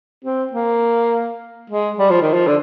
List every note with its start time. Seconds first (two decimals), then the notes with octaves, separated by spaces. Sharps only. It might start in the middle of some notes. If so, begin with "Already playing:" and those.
0.25 C4
0.53 A#3
1.70 G#3
1.98 G3
2.10 F3
2.22 D#3
2.34 F3
2.47 D3